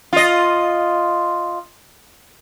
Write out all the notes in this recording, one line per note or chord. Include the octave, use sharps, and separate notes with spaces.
F4 D#5